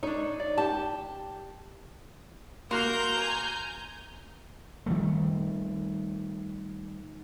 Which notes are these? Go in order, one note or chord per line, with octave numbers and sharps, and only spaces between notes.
D4 D#4 C#5
D5
G4 A5
A#3 F#4 A#4 A#5 C6 G6
G#5
D#3 G3 A3